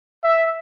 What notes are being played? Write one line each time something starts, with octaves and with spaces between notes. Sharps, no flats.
E5